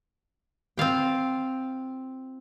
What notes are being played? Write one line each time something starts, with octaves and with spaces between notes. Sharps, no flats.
C4 F4 F5 G5